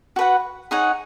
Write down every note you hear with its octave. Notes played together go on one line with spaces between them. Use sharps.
F#4 B4 F#5
D#4 G#4 C#5 F#5